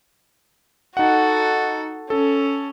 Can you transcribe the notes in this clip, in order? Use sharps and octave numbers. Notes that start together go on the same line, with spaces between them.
D#4 F#4 A4 F#5
C#4 A4